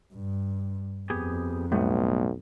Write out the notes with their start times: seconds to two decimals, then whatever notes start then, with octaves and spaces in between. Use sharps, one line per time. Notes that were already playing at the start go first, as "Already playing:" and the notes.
0.13 G2
1.10 F2 B3 G4 G#4
1.72 B1 A2 G3 B3